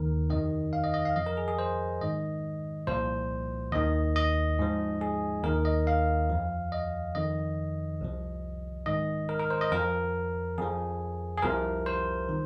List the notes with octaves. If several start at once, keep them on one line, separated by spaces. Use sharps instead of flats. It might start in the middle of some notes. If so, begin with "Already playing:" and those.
Already playing: D#2 D#3 A#4
F2 C3 D#3 D#5
F5
D#5
D#5
F5
F2 F3 D#5
A#4
G#4
G#4
C5
G#2 D#3 D#5
C2 A#2 F3 C5
D#2 D#3 D#5
D#5
G#2 F3
G#4
D#2 D#3 A#4
D#5
F5
F2 F3
D#5
F2 D#3 D#5
C2 C3 F3
G#2 D#3 D#5
A#4
A#4
C5
D#5
F2 F3 A#4
F2 F3 G#4
G#4
C2 C3 F3 A#4
C5
D#3